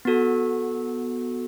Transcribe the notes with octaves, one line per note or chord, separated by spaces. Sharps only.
B3 F#4 A4